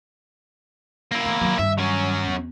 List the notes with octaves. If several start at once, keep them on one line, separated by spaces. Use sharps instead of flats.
A#3 E4
E3 A3
D#3 F#3
G2 D#3 E5
F#3 C#4
E2